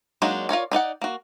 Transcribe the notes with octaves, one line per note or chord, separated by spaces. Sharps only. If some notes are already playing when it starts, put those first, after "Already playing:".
F#3 G#3 A#3 D4 D#4
F4 A#4 C#5 D5
D4 D#4 D5 F#5
A#3 F#4